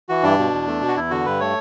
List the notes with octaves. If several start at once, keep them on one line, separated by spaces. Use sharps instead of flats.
E3 F#4
G2 D4
B2
E2
A3
B2
F#4
E2 E4
D3 F#4
G2 B4
A3 C#5